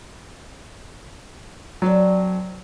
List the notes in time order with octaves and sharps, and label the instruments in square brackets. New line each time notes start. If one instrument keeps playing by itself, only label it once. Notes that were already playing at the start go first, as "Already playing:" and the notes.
[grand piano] F#3 [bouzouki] C4 A4 D5